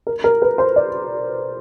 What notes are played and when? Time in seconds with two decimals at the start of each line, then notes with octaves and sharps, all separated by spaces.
0.07 A#4
0.24 A#4
0.42 B4
0.58 C5
0.76 D5